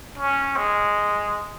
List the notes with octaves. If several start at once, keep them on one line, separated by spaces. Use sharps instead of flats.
C#4
G#3